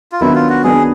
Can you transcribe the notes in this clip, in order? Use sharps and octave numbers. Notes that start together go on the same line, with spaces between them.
F4
D#3 F#3 B3 D4 E4
F4
F#4
D#3 F#3 B3 D4 G#4